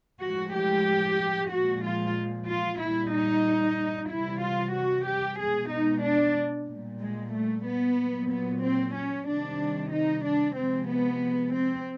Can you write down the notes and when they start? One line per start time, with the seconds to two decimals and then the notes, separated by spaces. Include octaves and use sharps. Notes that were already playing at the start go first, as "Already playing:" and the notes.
0.21 A2 F3 G#3 F#4
0.54 G4
1.50 A#2 F3 G#3 F#4
1.83 F4
2.47 F4
2.80 A#2 G3 E4
3.13 D#4
4.09 C3 E3 G3 E4
4.42 F4
4.74 F#4
5.07 G4
5.38 B2 G#3 G#4
5.71 D#4
6.03 D4
6.68 A#2 G3
7.00 G#3
7.33 A3
7.65 B3
7.97 A#2 F#3
8.29 B3
8.62 C4
8.94 C#4
9.26 C3 D#3 G3 D4
9.91 D#4
10.23 D4
10.56 C3 F3 G#3 C4
10.88 B3
11.53 C4